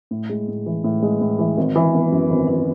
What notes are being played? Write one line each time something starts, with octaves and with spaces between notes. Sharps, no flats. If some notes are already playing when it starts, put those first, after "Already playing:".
A2
G#3
A2
E3
A2
G#3
A2
E3
G#1
E3
B3
F#2
G#1
E3